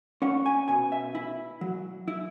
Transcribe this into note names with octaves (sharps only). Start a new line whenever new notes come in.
C#4 F#5
G#5
B2 G#5
E5
E4
F#3
E4